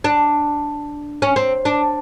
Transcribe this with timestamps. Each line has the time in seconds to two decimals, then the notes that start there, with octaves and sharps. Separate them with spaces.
0.04 D4
1.22 C#4
1.36 C4
1.65 D4